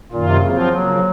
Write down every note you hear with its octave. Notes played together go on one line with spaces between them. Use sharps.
F#2 A#2 D#3 A#3 F4
C3
C#3 F#3 C4 F4
F3
C#3 F3 F#3 A#3